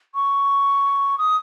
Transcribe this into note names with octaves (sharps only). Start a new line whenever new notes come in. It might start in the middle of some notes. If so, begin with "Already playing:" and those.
C#6
D#6